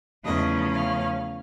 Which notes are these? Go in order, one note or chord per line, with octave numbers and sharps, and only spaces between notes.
E2 C#3 F3 A3 C#4 D#5
F5